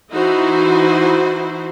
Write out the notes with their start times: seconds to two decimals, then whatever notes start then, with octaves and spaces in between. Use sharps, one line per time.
0.12 E3 D#4 E4 F#4 C5